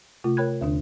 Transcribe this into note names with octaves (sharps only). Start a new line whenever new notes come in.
C3 A3 F4
A#4 C#5 G5 B5 F#6 G#6
D#2 D3 D4